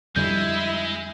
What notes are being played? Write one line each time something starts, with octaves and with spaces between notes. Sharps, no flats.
F2 D3 G3 G#3 E4 E5 G6